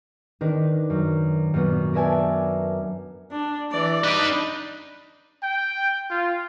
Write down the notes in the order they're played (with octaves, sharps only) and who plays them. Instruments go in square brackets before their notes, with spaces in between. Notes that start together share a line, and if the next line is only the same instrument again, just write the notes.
[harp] D#3 D4 A#4 B4
F#2
F#2 A#2 B3
A#4 B4 D5 E5 G#5 A5
[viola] D4
E3 D5
[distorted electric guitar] D4 B4 [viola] D#4
[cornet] G5
F4